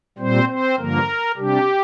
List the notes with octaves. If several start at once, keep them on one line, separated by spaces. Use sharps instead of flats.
A#2 G3 C4 C5
C4 C5
G2 D3 F3 A#3 A#4
C3 G3 D4 G4